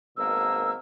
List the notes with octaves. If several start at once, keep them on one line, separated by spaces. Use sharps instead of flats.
G#1 B2 A#3 E6